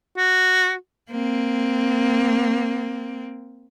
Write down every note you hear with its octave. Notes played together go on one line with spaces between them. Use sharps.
F#4
A#3 C4